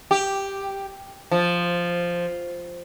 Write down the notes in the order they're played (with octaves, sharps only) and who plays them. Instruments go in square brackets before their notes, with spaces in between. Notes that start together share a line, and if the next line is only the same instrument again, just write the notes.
[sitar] G4
F3